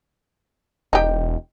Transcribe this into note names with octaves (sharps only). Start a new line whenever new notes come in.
E1 D#4 G4